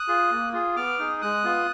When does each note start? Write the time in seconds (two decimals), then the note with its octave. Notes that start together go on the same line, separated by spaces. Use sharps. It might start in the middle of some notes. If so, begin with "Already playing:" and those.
Already playing: D#6 F#6
0.08 F4 G#4
0.31 A#3
0.53 F4 G#4
0.76 B3 D6 F6
0.99 D#4 G#4
1.21 G#3 D#6 F#6
1.44 B3 F4